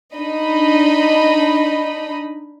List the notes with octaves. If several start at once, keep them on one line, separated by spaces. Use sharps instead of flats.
D4 D#4 D#5 B5